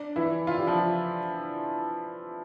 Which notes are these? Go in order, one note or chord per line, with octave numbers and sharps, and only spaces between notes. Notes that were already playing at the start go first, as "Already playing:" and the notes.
Already playing: D4
E3 E4
F4
G4
F3 F4